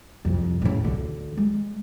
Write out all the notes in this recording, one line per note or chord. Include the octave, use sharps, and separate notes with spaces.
C2 F2
A2 C#3
D2 D3
G#3